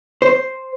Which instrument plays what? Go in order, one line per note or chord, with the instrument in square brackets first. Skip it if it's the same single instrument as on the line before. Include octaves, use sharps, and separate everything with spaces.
[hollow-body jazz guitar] C5